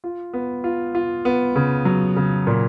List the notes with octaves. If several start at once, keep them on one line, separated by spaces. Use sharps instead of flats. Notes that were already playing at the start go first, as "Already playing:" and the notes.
F4
B3
F4
F4
B3
C#3
F#3
C#3
A#2